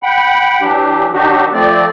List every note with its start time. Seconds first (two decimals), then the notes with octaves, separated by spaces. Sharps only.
0.03 F#5 G5 B5
0.61 E3 F#3 D4 G4
1.13 D#3 F#3 D4 D#4 F#4 G4
1.53 F3 A3 C4 D5